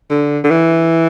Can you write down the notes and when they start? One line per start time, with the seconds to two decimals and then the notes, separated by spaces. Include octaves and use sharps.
0.10 D3
0.44 D3
0.51 E3